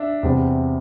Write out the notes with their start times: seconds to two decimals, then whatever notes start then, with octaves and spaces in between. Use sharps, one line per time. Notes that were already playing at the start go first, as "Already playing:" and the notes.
Already playing: D4 E5
0.23 E2 C3 G3 C4